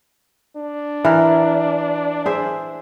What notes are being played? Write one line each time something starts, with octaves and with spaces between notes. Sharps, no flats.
D4
E3 A#4
G#4 C5 E5